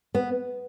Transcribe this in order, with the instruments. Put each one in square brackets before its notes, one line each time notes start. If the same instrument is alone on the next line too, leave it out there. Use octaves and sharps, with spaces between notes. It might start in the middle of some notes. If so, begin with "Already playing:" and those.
[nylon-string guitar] B3